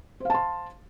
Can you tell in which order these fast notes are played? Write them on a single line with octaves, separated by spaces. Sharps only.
C5 F5 A5 C6